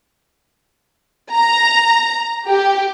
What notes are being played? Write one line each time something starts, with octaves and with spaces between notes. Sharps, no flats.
A#5
G4